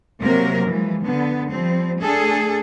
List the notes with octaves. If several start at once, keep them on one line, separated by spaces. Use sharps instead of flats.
C3 F#3 A#3 A#4
E3 F3 G#3
D3 B3
F3 G3 C4
A3 D4 G#4 A4